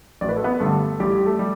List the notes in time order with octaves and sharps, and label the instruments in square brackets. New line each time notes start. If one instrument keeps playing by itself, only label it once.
[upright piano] A1 D5
B4
A4
B3 B4
G2 D3 G3 A3 A4
A1 G3 G4
A3 A4
G3